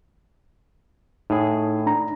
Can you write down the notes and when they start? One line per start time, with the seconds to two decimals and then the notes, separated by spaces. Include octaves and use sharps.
1.30 A2 D#4 G#4
1.86 D4 A#5